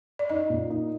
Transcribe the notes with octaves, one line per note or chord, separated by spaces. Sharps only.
D5
D#4 D#5
A#2
D#4